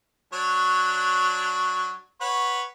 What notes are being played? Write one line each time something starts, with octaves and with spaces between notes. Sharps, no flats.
F#3 D4 C#5
B4 C#5 F#5